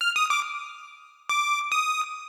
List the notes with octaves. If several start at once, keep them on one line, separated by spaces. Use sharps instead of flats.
F6
D#6
D6
D6
D#6